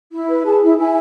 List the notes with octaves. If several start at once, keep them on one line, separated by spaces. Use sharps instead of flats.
E4
B4
G#4 A5
E4
E4 G#5